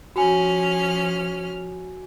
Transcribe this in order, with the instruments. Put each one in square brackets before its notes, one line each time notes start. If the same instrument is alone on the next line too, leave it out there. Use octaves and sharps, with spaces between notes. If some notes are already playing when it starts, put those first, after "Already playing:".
[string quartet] F3 C#4 F6 [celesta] F#4 G#5